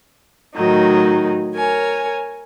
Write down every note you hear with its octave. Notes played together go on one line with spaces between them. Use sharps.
A2 D#3 F#3 D#4
A#4 C#5 G#5